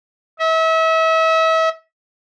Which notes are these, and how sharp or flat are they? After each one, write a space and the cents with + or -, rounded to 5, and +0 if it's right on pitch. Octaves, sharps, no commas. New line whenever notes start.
E5 -35